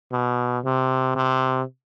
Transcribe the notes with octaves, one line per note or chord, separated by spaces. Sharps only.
B2
C3
C3